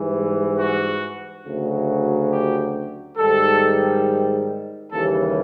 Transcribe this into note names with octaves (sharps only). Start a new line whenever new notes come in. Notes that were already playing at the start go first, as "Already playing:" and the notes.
Already playing: G#2 E3 G3
F#4
D2 C#3 F#3
G4
G#2 D#3 G3 A4
D#2 C#3 E3 G3 A4